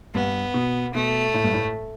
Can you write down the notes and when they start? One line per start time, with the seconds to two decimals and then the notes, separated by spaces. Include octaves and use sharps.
0.14 G2 B3
0.54 B2
0.94 B2 A3
1.34 A2
1.44 G2
1.54 A2